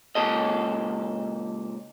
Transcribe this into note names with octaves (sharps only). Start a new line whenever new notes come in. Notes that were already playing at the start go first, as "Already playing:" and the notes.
C#2 A#2 A4 D#5